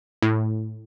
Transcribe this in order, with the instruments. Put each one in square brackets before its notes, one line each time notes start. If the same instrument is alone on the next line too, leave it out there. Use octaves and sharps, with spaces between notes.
[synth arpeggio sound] A2